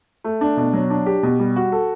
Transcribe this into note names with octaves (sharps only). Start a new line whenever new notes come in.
A3
D4
B2
F#3
D4
G4
B2
G3
F#4
A4